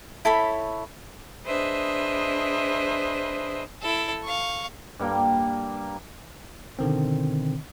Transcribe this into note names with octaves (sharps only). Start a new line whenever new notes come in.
E4 A4 C#5 B5
D4 G#4 B4 C5 D#5 E5
E4 A4
F5 C#6
G2 G3 A#3 G5
B2 D3 D#3 C4